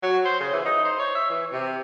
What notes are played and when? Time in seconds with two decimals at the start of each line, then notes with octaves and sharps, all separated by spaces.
0.03 F#3
0.25 C5
0.40 C#3
0.53 E3
0.65 D#4
0.85 C5
0.99 C#5
1.15 E5
1.30 E3
1.52 C3